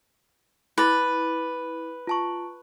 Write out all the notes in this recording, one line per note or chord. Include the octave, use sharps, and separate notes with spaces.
E4 B4 D6 A6
F4 A5 C#6